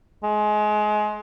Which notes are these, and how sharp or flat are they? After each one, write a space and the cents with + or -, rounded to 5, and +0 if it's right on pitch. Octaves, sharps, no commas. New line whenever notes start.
G#3 +25